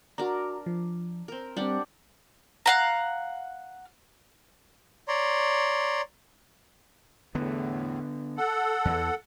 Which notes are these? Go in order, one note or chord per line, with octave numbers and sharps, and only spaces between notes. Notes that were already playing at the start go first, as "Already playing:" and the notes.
D4 F#4 A#4 A#5
F3
C4 A#4
G3 C4 D4 G4 F#5
F5 F#5 A#5
C#5 D5 A#5 C6
E2 A2 D3 B3
A4 F#5
E2 E3